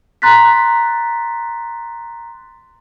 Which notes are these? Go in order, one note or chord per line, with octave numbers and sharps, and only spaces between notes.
A#5 C6 F#6 A6 B6